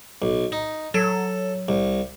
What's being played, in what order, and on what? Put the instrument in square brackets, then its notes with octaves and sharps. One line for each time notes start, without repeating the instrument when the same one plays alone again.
[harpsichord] B1
D#4
[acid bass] F#3 [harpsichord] A4
[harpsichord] C2